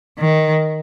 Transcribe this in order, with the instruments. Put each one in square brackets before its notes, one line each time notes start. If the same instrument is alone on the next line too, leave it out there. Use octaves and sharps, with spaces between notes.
[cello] D#3